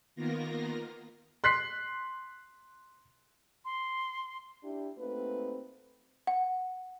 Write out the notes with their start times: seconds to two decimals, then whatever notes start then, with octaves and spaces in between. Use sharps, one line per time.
0.16 D#3 A#3 B3 F4 A#4 A#6
1.44 C6 F#6 B6 C7
3.65 C6
4.64 D4 E4 G4
4.98 A3 A#3 C4 D#4 F#4 B4
6.27 F#5